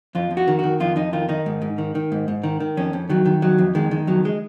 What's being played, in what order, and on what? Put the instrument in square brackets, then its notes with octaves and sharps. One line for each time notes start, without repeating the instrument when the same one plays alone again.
[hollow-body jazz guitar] F2 F4
F2
F#4
D#3
D#3 F#4
F2 F4
F2 D#4
D#3 F4
D#3 D#4
G#2
G#2
D#3
D#3
G#2
G#2
D#3
D#3
F2 C#4
F2
D#3 F#3
D#3
F2 F#3
F2
D#3 G#3
D#3
F2 F#3
G#3